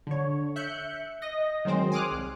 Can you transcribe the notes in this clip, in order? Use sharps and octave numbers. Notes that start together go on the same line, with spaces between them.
D3 C#5
E5 F#6 G6 C#7
D#5 A#6
D#3 F#3 G#3 C4 C5
G#5 C6 D6 D#6 F6 F#6
C2